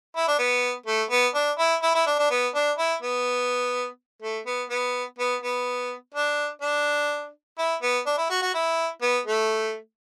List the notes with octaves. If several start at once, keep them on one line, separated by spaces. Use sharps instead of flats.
E4
D4
B3
A3
B3
D4
E4
E4
E4
D4
D4
B3
D4
E4
B3
A3
B3
B3
B3
B3
D4
D4
E4
B3
D4
E4
F#4
F#4
E4
B3
A3